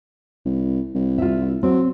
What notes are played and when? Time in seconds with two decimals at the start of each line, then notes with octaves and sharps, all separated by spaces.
0.45 C2
0.95 C2
1.18 F4 E5
1.63 F#3 C4